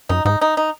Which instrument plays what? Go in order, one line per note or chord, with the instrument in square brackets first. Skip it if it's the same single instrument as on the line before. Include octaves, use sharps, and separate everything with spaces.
[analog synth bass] F#2 [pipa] D#4
[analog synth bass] G#2 [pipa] D#4
[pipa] D#4
D#4